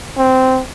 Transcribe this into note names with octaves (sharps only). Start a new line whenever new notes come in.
C4